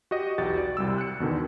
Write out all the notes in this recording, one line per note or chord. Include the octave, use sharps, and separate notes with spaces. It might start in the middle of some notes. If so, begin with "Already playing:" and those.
F#4 G4 D#5
B1 E2 F#4 G4 A6
D5
C2 G3 E6
F#6 C#7
E2 B2 D3 D#3